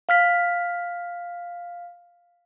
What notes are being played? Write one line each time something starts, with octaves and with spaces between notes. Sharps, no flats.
F5 F6 B6